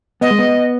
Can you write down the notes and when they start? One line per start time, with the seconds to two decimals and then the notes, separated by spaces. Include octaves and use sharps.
0.21 B3 D#5
0.30 G#3
0.39 B3